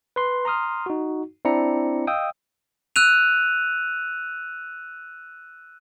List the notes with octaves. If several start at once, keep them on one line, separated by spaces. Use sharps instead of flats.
B4 C6
A#5 C6 D#6 F6
D#4 F#4
C4 D4 E4 D5 A#5 C#7
D#5 F5 G5 D#6 E6
E6 F#6 D#7 F7